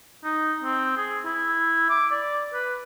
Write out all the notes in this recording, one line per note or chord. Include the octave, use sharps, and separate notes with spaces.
D#4
C4
G#4
E4
D6
D5
B4